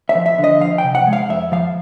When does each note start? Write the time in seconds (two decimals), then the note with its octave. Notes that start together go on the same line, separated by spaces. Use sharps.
0.09 E5
0.15 F3
0.26 E5
0.38 D3
0.44 D#5
0.60 F3 F5
0.78 G5
0.84 C3
0.95 F#5
1.07 G#3
1.13 F5
1.29 F2 E5
1.52 F3 F5